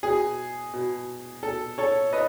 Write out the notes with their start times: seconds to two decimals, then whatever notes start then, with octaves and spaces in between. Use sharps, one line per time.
0.03 B2 G#4
0.74 B2
1.43 B2 A4
1.78 A4 C#5
2.13 B4 D#5